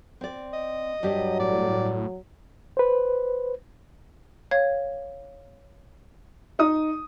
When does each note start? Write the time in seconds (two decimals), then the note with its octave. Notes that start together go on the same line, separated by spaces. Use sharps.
0.21 C4 D5
0.53 D#5
1.03 G2 F#3 G3 G4
1.40 A2 D5
2.77 B4 C5
4.51 C#5 F5 G#6
6.59 D#4 D#6